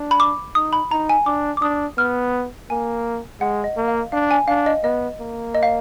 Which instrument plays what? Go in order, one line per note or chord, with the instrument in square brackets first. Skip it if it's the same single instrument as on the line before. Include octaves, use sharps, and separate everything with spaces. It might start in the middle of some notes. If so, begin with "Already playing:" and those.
Already playing: [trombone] D4
[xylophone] B5
D6
[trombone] D#4 [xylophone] D#6
[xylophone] B5
[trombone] D#4 [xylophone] A#5
[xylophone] G#5
[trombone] D4 [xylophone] D6
[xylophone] D6
[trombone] D4 [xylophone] D#6
[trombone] B3 [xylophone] F6
[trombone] A#3 [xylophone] G#5
[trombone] G#3 [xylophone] F#5
[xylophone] D#5
[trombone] A#3
[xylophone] F5
[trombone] D4 [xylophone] F5
[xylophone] G#5
[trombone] D4 [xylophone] F5
[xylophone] D#5
[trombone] B3 [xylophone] D#5
[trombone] A#3
[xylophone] D#5
F5